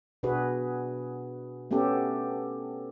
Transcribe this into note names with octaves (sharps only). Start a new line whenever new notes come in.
B2 D4 F#4 G#4 B4
A3 B3 C#4 G4 A4